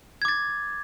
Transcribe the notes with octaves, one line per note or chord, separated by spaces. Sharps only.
D6 G#6 A6